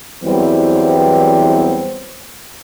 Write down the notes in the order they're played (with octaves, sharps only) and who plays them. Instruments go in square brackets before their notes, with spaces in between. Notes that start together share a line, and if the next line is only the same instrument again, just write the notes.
[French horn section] E2 E3 F#3 G3 B3 C4